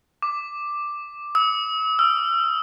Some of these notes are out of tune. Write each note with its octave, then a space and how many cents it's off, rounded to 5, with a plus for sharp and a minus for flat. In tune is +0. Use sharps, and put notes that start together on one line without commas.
D6 +5
E6 -45
E6 +45